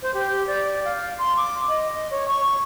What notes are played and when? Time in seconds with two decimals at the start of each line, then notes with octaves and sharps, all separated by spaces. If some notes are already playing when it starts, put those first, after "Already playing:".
0.02 C5
0.14 G4
0.47 D5
0.85 F5
1.19 C6
1.37 D6
1.69 D#5
2.11 C#5
2.28 C#6